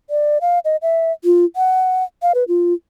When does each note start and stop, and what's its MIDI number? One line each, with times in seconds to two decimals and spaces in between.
0.10 0.38 74
0.41 0.59 77
0.65 0.76 75
0.82 1.12 76
1.24 1.45 65
1.56 2.04 78
2.22 2.32 77
2.35 2.44 71
2.48 2.74 65